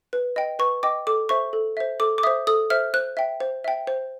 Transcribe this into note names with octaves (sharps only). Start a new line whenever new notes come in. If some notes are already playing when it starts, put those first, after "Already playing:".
B4
D#5 G5
B4 C#6
D#5 G5 D6
A4 D6
C5 E5 C#6
A4
C5 E5
A4 D6
D6
C5 E5 D#6
A4 D#6
C5 E5 F6
C5 F#6
E5 G5
C5
E5 G5
C5